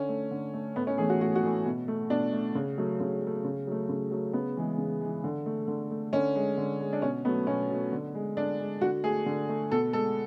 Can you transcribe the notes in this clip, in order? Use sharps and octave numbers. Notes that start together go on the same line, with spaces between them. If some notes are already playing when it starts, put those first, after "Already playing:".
Already playing: D3 C#4
A3
D3
A3
A2 B3
C#4
E3 A3 G#4
F#4
A2 F#4
F#4
E3 A3
B2
A3
B2 D4
A3
C#3
F#3 A3
C#3
F#3 A3
C#3
F#3 A3
C#3
F#3 A3
C#3 B3
E3 G#3
C#3
E3 G#3
D3
A3
D3
A3
D3 C#4
G#3
D3
G#3
D4
B2 C#4
F#3 A3 B3
B2 C#4
F#3 A3
D3
G#3
D3 D4
G#3
D3 F#4
A3 G#4
D3
A3
B2 A4
G#3 A4